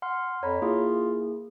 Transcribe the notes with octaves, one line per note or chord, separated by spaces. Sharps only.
F#5 C6 F6
F2 C#5 A#5 B5
A#3 E4 F4 G#4